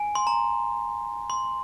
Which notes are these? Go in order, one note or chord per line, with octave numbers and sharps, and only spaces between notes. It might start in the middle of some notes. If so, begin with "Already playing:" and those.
Already playing: G#5
C6
A#5
C6